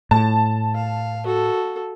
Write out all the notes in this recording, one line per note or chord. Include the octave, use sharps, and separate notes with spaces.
A2 A5
F5
F#4 A4